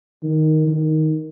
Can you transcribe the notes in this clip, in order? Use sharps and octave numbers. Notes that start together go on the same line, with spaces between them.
D#3
D#3